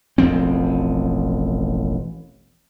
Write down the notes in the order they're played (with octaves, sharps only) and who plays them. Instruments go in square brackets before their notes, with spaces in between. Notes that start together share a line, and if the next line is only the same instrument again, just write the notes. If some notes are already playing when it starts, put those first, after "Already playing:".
[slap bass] E1 A1 F3 C4